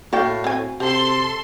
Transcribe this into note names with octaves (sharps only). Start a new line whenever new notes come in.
A2 A#3 F#4 D5 F5 G5
C4 G5 G#5
C3 G4 A4 C6